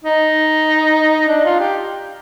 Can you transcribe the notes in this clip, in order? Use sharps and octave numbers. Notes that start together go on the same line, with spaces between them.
D#4
D4
F4
G4